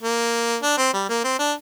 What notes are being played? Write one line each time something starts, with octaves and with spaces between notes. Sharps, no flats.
A#3
D4
C4
G3
A#3
C4
D4